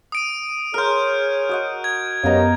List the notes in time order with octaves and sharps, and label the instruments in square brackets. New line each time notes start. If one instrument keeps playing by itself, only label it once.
[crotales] D#6 D7 D#7
[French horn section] G#4 C#5 [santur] A#4 C6 [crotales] F6 G6
[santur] F#4 D#5 F#5
[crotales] G#6
[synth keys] F#2 B3 D#5 [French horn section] G4 A#4 C#5 [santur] F5 A#5